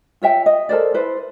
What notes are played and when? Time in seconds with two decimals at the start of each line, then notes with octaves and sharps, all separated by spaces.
0.22 F4 C#5 E5 G5
0.46 D#5
0.69 A4 A#4 C5 D5
0.94 E4 B4 C5